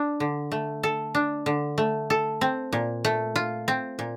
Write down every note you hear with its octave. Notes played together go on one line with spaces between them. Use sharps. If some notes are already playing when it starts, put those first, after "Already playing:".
Already playing: D4
D3
A3
A4
D4
D3
A3
A4
C4
A#2
A3
F4
C4
A#2